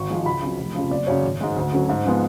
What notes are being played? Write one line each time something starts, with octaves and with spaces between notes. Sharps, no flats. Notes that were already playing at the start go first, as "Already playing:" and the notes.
Already playing: G#1 C#6
G#2 F3 G#3
C#2 B5
C#3 F#3 C#4
F1
F2 C#3 F3
F#1 D5
F#2 C#3 C#5
G#1
G#2 G#3
D2
D3 F#3 C#4
G#2
F3 G#3 B3